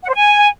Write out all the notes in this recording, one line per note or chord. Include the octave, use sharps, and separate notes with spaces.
F#5
C5
G#5